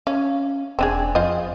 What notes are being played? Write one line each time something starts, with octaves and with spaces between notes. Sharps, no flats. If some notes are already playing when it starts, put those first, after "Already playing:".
C#4 F5
E1 C4 D4 G#4
F2 F4 C5 D#5